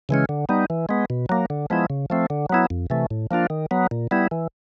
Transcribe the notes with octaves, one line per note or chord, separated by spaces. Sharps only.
C#3 E3 G#3 C#4
D3
G3 B3 D#4
E3
G#3 B3
B2
F#3 A#3
D3
F3 G#3 B3 E4
C#3
F3 A3 C4
D3
F#3 B3 E4
F2
C3 E3 A3
A2
F3 A#3 D4 F4
D#3
F#3 B3
A#2
G3 B3 E4
E3